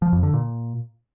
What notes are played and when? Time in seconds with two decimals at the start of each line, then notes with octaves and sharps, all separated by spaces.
0.02 F3
0.12 F2
0.23 D3
0.33 A#2